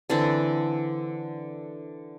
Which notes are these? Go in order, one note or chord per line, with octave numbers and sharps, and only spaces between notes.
D3 E3 C4 D4